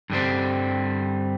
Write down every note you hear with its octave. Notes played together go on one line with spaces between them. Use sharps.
G2 D3 G3 C4